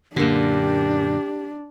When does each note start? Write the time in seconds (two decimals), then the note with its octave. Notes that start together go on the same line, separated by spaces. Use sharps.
0.16 F#2 A#2 D3 A#3 D4 G4